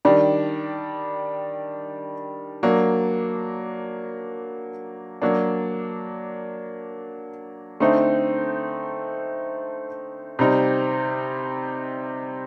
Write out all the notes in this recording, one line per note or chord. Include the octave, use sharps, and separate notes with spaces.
D#3 G3 D4
F#3 A#3 D4
F#3 A#3 D4
D3 A3 C4 D#4
C3 G3 C4 D#4